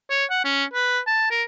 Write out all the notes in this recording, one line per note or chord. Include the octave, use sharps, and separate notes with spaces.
C#5
F#5
C#4
B4
A5
A#4